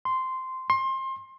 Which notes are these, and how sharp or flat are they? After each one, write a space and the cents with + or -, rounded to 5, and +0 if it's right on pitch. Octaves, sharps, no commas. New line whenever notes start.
C6 -10
C6 +25